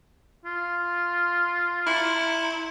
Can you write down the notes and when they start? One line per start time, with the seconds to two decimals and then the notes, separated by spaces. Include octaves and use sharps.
0.45 F4
1.87 E4